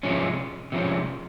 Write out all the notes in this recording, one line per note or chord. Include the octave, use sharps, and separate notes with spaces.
C3 F3 G#3 C#4
C3 F3 G#3 C#4